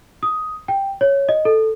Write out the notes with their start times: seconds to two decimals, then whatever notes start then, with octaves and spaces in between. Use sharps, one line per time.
0.23 D#6
0.68 G5
1.01 C#5
1.29 D#5
1.45 A4